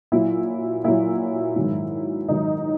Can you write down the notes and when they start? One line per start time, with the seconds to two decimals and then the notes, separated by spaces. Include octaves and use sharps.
0.12 A#2 F#3 E4
0.84 A#2 F#3 E4
1.56 G#2 D#3 F#3
2.28 G#2 D#3 F#3 D#4